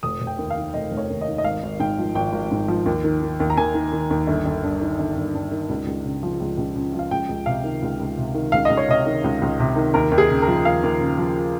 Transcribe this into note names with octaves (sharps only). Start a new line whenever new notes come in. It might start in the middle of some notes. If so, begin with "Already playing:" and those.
F1 D#6
F1
G5
D#2
F5
D#3
F1 D#5
F1
C#5
D#2
D#5
D#3
D#5
G#1 F5
G#1
G#2 G5
F3
G#1 G5
G#1
G#2
F3
D#2
D#3
D#3
D#2
A#5
D#2 G#5
D#3
D#3
D#2
G1
G1
G2
D#3
G1
G1
G2
D#3
C#2
C#2
C#3
F3
C#2
C#2
C#3
F3
F5
C#2 G5
C#2
C3 F5
D#3
C#2
C#2
C3
D#3
C#2 F5
C#2 D#5
C#5
C3 D#5
D#3
C#2
C#2
C3
D#3
D#2 A#4
D#2
G#4
C#3
A#4
F3
D#2 F5
D#2
C#3
F3